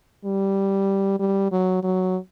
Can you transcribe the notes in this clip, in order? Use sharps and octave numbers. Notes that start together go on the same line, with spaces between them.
G3
G3
F#3
F#3